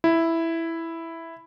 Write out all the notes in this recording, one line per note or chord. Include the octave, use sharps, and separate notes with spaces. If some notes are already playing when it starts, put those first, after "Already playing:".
E4